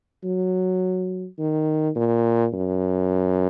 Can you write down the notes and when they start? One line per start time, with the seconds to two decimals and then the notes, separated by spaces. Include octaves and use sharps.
0.24 F#3
1.39 D#3
1.96 A#2
2.53 F#2